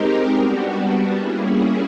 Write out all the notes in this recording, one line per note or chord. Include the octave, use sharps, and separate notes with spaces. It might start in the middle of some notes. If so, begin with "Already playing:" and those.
Already playing: G#3 C4 D#4 G4 A#4
G3 B3 D4 F#4
G3 A#3 C#4 E4 G#4